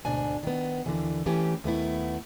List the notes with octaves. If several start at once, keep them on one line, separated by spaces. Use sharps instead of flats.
D2 G#2 B2 D4 G#5
D#3 B3
D#2 D3 E3
E3 A3 C#4 G4
D#2 A3 B3 E4